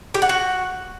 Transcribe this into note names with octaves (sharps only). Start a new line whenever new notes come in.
G4
F#5
F#4